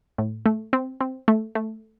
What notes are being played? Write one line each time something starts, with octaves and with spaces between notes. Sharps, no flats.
A2
A3
C4
C4
A3
A3